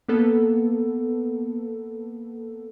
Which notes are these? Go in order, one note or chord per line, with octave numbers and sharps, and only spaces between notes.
A#3 B3 A4